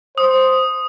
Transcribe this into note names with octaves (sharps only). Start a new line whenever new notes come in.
C5 D#6